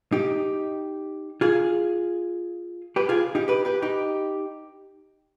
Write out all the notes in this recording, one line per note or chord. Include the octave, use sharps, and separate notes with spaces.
D#4 G4
F4 G#4
G4 B4
F4 G#4
D#4 G4
G4 B4
G4 B4
D#4 G4